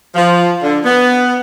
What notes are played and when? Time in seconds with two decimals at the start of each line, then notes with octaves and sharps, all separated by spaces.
0.15 F3
0.62 D3
0.85 B3